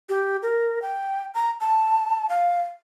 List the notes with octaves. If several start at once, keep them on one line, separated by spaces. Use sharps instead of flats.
G4
A#4
G5
A#5
A5
F5